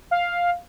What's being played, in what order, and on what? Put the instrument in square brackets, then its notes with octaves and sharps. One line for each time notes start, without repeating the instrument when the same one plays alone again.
[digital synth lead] F5